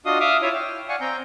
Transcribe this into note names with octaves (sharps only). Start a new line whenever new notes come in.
D4 F4 F#4 D#5 F5 D#6
E5 F5 D6 D#6 F6
E4 F4 C#5 E5
G5
D5 F5 F#5 G#5 C#6
C4 G5 A#5 G6